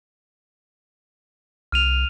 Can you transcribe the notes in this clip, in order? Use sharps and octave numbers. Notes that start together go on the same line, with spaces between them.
C2 F6 D#7 F7